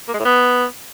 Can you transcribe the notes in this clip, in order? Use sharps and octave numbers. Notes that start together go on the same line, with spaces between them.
A#3
G#3
A2
B3